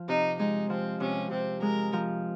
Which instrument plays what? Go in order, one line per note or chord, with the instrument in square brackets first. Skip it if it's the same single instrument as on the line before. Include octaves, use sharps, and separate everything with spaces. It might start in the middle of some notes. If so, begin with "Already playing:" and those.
Already playing: [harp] F3
[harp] C3 [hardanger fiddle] D#4
[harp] G#3 [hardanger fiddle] D#4
[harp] F3 [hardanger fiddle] C4
[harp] C3 [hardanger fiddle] C#4
[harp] C3 [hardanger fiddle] C4
[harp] G#3 [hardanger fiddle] A#4
[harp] F3